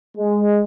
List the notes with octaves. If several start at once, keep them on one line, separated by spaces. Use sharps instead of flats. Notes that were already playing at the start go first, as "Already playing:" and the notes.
G#3